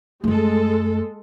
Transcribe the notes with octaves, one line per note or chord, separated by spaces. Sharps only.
F#2 G#3 A3 A4